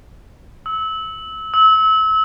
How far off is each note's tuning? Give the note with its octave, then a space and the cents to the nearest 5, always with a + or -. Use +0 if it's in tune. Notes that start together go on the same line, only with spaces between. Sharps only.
E6 -25
E6 -30